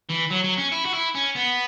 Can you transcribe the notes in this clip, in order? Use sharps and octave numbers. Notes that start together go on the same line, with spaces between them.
E3
F#3
F#3
C#4
E4
F#4
E4
C#4
B3